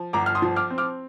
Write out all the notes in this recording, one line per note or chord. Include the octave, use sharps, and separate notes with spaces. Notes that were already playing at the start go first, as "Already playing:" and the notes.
Already playing: F3
G1 A#5 D6
F6
C6 D#6
F3
D6 F6
C4
D6 F6